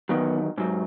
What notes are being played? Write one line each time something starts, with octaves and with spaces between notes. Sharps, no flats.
E2 D#3 F#3 B3
G#2 F#3